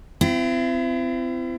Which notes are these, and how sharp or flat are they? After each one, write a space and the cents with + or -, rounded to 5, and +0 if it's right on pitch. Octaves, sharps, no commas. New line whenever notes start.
C4 -30 E4 +40